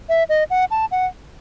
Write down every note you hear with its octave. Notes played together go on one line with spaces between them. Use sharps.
E5
D#5
F#5
A5
F#5